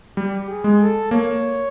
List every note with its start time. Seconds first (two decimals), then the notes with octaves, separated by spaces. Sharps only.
0.16 G3 G4
0.49 G#4
0.64 G#3
0.80 A4
1.11 A#3 C#5